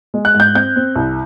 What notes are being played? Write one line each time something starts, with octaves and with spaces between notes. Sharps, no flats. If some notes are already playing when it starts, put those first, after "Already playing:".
G#3
F#6
G#2
G6
C4 G6
C4
C2